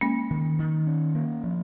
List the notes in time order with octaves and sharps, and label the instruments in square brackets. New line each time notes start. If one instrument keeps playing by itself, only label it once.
[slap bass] G#3 [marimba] A#3 C#4
[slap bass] D#3
D#3
C#4
A#3
F3